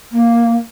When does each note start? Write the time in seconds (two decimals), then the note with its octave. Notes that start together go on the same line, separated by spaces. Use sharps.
0.12 A#3